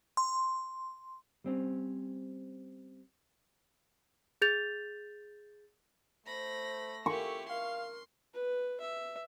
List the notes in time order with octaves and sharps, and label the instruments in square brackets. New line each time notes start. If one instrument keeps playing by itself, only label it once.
[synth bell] C6
[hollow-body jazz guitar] G3 C4 C#4
[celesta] G#4 G6 A6 F7
[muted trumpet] A3 [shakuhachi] C5 [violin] B5 A#6
[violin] E4 G4 [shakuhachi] A4 [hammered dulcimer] C#6
[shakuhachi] A#4 [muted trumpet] F5 [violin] C6
[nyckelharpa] B4
E5